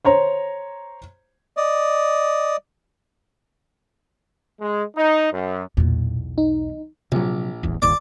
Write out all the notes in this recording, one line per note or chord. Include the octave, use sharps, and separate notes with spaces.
C5 C#5 A#5
D5 D#5
G#3
D#4
F#2
B1 E2 A#2
D#4
A#1 C3 F#3
D#1 A1 E2
G1 D#2 A#2 D5 D6